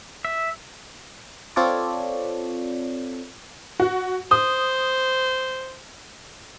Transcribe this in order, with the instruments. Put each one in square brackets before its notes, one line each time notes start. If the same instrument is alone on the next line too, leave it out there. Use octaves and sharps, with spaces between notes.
[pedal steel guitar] E5
[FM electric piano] C4 F4 A4 C#5 D5
[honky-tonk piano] F#4
[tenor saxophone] C5 [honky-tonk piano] D#6